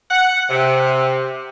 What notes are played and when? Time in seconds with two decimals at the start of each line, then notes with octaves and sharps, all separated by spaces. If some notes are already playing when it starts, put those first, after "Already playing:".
0.11 F#5
0.50 C3